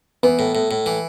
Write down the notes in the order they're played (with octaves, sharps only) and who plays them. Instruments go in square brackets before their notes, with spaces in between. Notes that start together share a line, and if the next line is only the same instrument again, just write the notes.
[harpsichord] E3 [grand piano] B3
[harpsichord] A2
A2
A2
E3